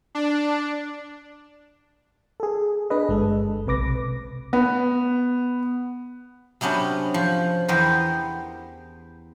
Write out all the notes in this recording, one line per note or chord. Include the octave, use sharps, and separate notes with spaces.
D4
G#4 A4
D4 G#4 B4 D#5
G1 G#3 A4
B1 C3 B4 D6 A#6
B3
C3 F#3 B3 C#4 D4
F3
E2 B3 G4 A#4 C5